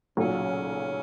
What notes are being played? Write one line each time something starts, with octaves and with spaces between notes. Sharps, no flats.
B1 A#2 C#3 F#3 C#4